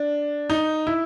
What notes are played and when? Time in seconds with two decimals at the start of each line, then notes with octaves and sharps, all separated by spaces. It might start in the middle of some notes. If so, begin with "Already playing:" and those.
Already playing: D4
0.50 D#4
0.87 E4